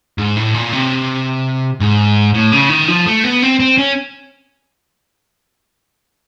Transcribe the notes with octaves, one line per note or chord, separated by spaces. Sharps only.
G#2
A2
A#2
C3
G#2
A2
C#3
D#3
F3
A3
B3
C4
C4
C#4